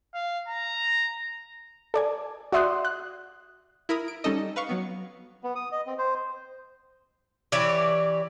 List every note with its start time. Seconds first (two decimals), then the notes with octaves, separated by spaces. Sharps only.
0.14 F5
0.48 A#5
1.94 A4 D5 G#5
2.52 F#4 D5 E5 C6 D#6 F#6
2.85 F#6
3.89 E4 A#4 B5 D#6
4.08 D7
4.24 G3 C#4 D#4 A4 D#5
4.56 B4 F5 C#6
4.69 F#3 B3
5.43 B3
5.55 D#6
5.72 D#5
5.87 C4
5.98 C5
7.52 E3 G4 C#5 D5